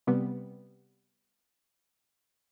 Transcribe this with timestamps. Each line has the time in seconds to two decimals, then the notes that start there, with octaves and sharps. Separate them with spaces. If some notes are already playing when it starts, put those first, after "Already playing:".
0.07 C3 G3 B3